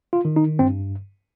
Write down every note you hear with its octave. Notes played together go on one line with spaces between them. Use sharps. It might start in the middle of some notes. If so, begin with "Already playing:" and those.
F4
D#3
D#4
G2 C4